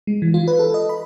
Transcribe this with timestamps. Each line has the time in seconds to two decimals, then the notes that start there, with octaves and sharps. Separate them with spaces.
0.07 G#3
0.22 E3
0.34 F4
0.48 B4
0.59 A4
0.74 D#5
0.89 B5